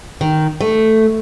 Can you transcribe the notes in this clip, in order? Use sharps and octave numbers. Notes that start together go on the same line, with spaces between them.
D#3
A3